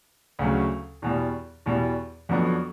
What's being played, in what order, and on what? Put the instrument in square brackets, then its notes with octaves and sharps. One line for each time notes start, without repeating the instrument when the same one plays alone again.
[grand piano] D2 C#3 F#3
E2 B2 G3
E2 B2 G3
F2 D3 F#3 B3 D4